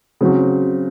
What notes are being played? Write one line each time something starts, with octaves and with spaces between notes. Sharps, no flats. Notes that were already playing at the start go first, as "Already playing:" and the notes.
C#3 F#3 C4 F#4